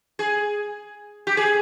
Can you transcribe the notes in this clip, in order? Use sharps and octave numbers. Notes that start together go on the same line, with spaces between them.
G#4
G4
G#4